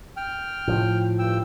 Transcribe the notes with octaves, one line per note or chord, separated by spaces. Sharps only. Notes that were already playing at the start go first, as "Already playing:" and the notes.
G5 F6
A2 F3
G2 G5 E6